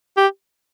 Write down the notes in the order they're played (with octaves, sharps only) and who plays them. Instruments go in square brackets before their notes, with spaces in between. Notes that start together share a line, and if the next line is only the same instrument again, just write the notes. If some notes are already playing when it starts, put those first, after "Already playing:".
[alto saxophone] G4